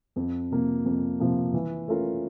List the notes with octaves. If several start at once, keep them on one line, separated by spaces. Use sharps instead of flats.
F2
C3 F3 A#3
F2
C3 F3 A#3
E3
A3 C#4 F4 A#4